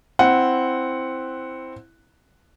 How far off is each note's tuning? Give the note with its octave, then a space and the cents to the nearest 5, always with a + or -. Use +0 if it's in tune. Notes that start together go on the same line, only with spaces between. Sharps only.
C4 +0 E4 +0 F#5 +0